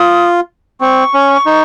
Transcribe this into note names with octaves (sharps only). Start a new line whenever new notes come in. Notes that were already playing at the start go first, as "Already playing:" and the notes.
Already playing: F4 D#6
C4 C#6
C#4
D#4